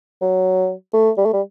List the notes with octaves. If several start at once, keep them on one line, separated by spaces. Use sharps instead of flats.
F#3
A3
G3
A3
G3